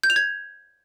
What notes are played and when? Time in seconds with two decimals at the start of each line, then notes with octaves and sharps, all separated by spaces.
0.04 G6
0.10 F7
0.16 G#6